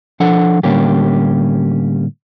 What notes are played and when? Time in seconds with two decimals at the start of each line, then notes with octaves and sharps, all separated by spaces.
0.20 F3 D4 A4 F#5
0.63 A2 D3 G3 A#3 C#4 G4